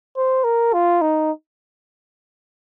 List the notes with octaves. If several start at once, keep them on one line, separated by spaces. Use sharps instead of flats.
C5
A#4
F4
D#4